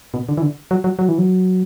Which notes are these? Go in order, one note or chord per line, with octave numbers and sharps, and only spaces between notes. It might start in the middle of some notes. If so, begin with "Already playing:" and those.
B2
D3
E3
D3
F#3
F#3
F#3
E3
F#3